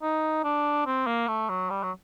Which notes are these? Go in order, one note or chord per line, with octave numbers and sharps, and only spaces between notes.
D#4
D4
C4
A#3
A3
F#3
G3
F#3